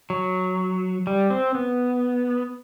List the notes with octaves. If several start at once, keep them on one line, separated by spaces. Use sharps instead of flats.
F#3
G3
C4
B3